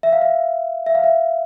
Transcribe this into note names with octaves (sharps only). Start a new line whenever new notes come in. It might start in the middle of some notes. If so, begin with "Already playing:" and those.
E5
F5
E5
E5
F5
E5